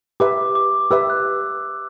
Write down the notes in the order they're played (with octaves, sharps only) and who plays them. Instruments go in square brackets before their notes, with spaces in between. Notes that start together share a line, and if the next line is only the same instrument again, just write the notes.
[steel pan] G4 B4 E5 [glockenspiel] D6
[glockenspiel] D6
[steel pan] G4 B4 E5 [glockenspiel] E6
[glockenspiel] F#6